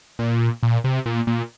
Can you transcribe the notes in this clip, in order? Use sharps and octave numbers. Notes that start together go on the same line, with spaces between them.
A#2
A#2
C3
A#2
A#2